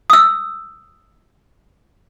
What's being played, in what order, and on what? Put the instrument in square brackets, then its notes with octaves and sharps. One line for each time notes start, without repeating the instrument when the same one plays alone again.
[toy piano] D#6 E6